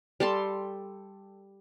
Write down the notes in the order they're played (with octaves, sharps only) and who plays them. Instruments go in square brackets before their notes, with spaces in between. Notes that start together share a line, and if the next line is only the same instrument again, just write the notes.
[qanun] G3 A4 A5 C6